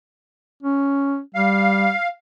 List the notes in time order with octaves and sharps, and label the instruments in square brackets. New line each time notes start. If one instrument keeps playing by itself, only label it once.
[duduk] C#4
[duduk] G3 [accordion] F5